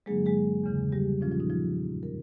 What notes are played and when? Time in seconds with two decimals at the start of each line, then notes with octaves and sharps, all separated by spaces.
0.06 G2 D3 F#3 G#3 A#3 D4 G#4
0.26 G#3 G#4
0.64 E2 C#3 E3
0.92 G3 G4
1.21 A#2 F3 G#3 C#4 F4
1.31 F3 F4
1.40 D#4
1.50 F3 F4
1.79 F#2 C#3 F3
2.03 A#4